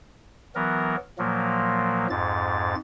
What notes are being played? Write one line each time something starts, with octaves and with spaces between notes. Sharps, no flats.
E3 F#3 B3 A#4
A#2 F3 F#3 A#3
F2 G#2 A6